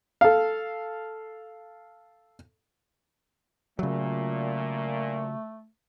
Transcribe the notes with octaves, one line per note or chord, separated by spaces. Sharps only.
A4 F5
A#2 C#3 F#3 A3